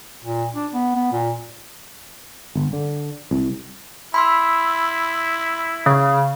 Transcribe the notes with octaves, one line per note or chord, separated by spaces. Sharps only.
A#2
D4
B3
B3
A#2
G1
D3
C2
E4 B5 C6 E6
C#3